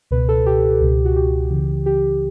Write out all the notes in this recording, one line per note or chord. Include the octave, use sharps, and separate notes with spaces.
C#2 B2 B4
A4
G4
C#2 B2
F#4
G4
C#2 C#3 E3
G4